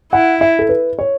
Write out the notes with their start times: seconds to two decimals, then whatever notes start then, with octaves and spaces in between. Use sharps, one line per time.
0.13 E4 F#5
0.41 E5
0.59 A4
0.69 B4
0.99 C#5